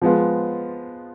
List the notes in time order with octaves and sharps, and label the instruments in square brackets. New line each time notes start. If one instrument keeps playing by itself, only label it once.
[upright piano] F3 G#3 B3 F4